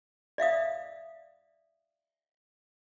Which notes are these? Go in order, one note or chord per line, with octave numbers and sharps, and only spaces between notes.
D5 E5 F5 D#6